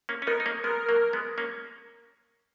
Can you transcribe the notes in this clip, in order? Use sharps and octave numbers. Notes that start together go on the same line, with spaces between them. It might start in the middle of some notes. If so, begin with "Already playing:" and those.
A#3 C#4
C#4
B3 D#4 A#4
D#4
A#3 C#4
G#3 B3 A#4
F#3 A#3
G#3 B3
A#3 C#4